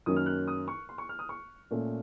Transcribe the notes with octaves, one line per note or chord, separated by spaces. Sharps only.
F#2 D#3 F#3 A#3 C#4 D#6
F6
F#6
D#6
C#6
C6
C#6
F6
D#6
C#6
A#2 A3 C#4